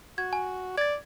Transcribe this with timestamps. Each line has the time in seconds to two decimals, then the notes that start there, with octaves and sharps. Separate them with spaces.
0.18 F#4 G#6
0.33 G#5
0.78 D5 G#6 A6